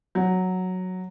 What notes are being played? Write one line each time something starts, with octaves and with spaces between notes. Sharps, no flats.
F#3